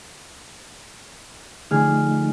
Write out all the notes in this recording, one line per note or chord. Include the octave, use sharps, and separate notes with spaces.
D3 F3 A3 D#4 G#4 F6